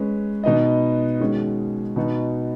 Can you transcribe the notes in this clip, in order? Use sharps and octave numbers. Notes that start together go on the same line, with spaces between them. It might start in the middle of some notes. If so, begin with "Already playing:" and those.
Already playing: G#3 C#4 B4
B2 B3 D#4 B4 D#5
D#3 G#3 C#4 F#4
B2 B3 D#4 F#4